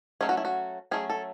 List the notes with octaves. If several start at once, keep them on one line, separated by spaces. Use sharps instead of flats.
F#3 A3 C#4 G#4
F#4
E4
F#4
F#3 A3 C#4 G#4
A4